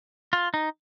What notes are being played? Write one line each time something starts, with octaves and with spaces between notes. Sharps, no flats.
F4
D#4